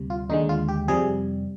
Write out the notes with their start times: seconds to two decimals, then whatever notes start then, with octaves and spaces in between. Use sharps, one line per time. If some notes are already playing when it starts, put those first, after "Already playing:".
Already playing: D2 C3 G3
0.10 F4
0.29 D#2 D3 G#3 D#4
0.49 F4
0.68 G4
0.88 F2 C3 G3 G#4